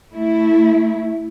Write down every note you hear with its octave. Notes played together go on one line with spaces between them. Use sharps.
A3 E4